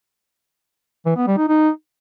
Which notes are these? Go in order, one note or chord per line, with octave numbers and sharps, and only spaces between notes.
E3
B3
G3
D#4
D#4